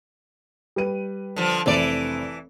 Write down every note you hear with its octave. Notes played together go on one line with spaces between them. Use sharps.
G3 B4 D#7
D3 F3
F1 E3 C4 D5